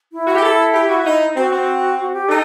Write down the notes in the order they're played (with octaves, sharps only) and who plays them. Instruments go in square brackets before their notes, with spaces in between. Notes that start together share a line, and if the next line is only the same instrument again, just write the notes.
[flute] E4
[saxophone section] F#4
G4
A4
G4
F#4
D#4
[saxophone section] C4 [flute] F#4
[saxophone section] C4
[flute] F#4
G4
[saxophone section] D#4 [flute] A4